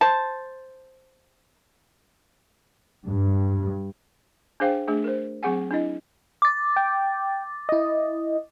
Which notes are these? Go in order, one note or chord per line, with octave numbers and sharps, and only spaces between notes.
C5 A5
G2
D4 G#4 C5 F5 G5
A3 D4 G#4
A#4 C5
F#3 C4 G#4 F#5 G#5
D4 E4 D#5
D6 A6
G5
E4 D#5